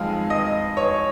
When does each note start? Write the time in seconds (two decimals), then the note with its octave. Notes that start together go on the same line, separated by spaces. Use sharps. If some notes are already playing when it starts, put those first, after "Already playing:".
Already playing: F2 D#3 G#3 D#4 F5
0.30 D#5
0.77 C#5